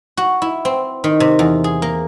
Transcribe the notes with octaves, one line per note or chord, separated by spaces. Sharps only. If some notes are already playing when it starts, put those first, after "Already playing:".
F#4
E4
C4
D#3
C3
E2
G#4
A#3